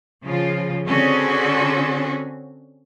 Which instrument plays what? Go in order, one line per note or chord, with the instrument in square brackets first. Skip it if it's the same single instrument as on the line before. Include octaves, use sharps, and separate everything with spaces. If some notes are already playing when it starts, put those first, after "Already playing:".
[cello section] C#3 F3 F4
D3 C4 C#4 F#4 G#4